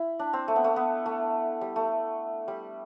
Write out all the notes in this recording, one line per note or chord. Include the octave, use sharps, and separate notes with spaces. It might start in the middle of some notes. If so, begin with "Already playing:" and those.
Already playing: E4
D4
C4
A3
B3
A3
B3
A3
G3
A3
G3